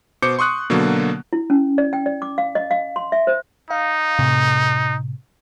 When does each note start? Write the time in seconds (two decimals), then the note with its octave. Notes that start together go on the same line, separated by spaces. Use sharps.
0.22 B2 C5 D6 G6 C#7
0.39 C6 C#6 D#6 F#6
0.70 B2 D3 F#3 A#3
1.33 E4
1.50 C#4
1.78 D5
1.93 G5
2.06 D5
2.22 D6
2.38 F5
2.55 D#5
2.71 F5
2.96 C6
3.12 E5
3.27 C5
3.71 D#4 F5
4.19 A2 C3